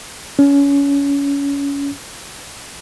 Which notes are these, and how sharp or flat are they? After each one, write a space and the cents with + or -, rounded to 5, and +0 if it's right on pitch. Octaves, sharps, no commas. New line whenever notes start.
C#4 +25